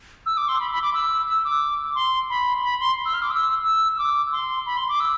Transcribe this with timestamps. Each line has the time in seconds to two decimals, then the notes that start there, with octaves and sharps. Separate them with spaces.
0.26 E6
0.37 D6
0.48 C6
0.60 B5
0.71 B5
0.82 D6
0.94 E6
1.28 E6
1.45 D6
1.95 C6
2.30 B5
2.63 B5
2.80 C6
3.05 E6
3.14 F6
3.22 D6
3.31 E6
3.65 E6
3.95 E6
3.99 D6
4.32 C6
4.66 B5
4.77 C6
4.89 D6
5.00 E6